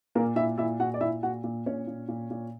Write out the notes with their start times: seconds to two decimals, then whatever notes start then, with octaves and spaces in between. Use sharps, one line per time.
0.15 A#2 A#3 A#4
0.36 A#2 E4 E5
0.58 A#2 E4 E5
0.80 A#2 F#4 F#5
0.94 D5
1.01 A#2 E4 E5
1.23 A#2 F#4 F#5
1.44 A#2
1.66 A#2 C#4 C#5
1.87 A#2
2.08 A#2
2.31 A#2